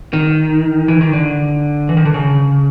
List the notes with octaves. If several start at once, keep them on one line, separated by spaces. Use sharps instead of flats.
D#3
E3
D#3
D3
E3
D#3
D3
C#3